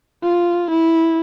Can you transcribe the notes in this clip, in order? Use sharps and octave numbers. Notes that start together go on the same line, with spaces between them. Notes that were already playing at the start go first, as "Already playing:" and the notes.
F4
E4